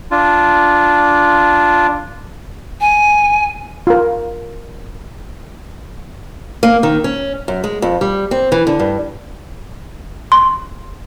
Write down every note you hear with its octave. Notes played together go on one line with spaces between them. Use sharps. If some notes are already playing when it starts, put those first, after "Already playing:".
D4 F4
G#5
F4 A#4
A#3
D#3
C#4
F#2
G#3
F2
G3
C4
E3
D3
G2
C6